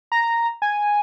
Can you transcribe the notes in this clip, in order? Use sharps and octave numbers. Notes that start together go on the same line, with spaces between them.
A#5
G#5